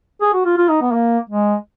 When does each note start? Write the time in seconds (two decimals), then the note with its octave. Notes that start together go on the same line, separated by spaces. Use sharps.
0.21 G#4
0.33 F#4
0.45 F4
0.57 F4
0.69 D#4
0.81 B3
0.93 A#3
1.29 G#3